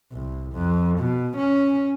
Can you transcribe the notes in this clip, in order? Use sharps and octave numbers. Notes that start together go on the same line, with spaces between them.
C2
F2
B2
C#4